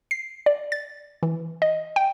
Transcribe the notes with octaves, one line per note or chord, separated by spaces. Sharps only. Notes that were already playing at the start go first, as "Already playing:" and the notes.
C7
D5
A6
E3
D#5
G5